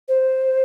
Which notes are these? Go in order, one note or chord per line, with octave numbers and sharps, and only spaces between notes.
C5